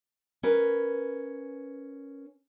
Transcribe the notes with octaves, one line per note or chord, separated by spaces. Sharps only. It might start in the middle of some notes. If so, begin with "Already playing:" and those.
C#4 A#4 B4